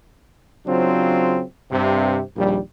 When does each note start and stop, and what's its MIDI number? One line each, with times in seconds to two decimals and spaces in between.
0.66 1.42 49
0.66 1.42 54
0.66 1.42 60
0.66 1.42 62
0.66 1.42 65
0.66 1.42 72
1.71 2.21 43
1.71 2.21 48
2.36 2.58 34
2.36 2.58 39
2.36 2.58 55